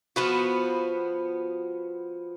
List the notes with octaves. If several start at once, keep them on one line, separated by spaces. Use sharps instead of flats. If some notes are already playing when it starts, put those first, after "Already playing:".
F3 B3 F#4